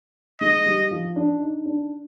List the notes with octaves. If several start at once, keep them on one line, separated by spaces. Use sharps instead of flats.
G#3 D#5
G3
F3
D4
D#4
D4